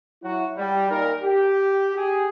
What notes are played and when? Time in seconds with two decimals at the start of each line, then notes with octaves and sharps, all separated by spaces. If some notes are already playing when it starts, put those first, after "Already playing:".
0.23 F#3 E4 F#4
0.58 G3
0.90 A#2 D#4 A#4
1.23 G4
1.95 G4 G#4